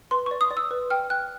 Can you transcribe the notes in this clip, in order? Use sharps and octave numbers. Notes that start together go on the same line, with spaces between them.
B4 C6
D5 C#6
D#6
D5
E6
B4
G5 F6
G5 F#6